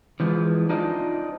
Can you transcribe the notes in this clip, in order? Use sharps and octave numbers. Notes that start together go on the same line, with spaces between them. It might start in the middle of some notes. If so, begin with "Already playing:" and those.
E3 F3 G#3
D4 D#4 F4 C5 D#5